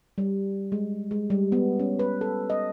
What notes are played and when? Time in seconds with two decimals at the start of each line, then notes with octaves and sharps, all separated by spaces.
0.18 G3
0.72 G#3
1.11 G#3
1.30 G3
1.52 B3
1.80 C#4
1.99 B4
2.21 A4
2.50 D#5